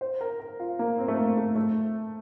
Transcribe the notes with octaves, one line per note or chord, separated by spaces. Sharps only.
C5
A#4
A#4
F4
A#3
C4
A3
A#3
A3
A3